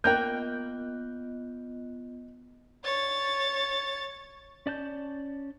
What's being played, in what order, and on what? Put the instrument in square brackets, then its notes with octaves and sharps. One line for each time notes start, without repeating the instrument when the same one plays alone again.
[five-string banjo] A#3 A#4 G5 [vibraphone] B3 F4 D#5 [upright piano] F#6 G6
[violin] C#5 A6
[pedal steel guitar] C#4 D5 A5 G6